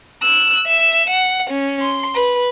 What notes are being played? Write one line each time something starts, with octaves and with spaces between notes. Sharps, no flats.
E6 F#6
E5 E7
F#5
C#4
C6
B4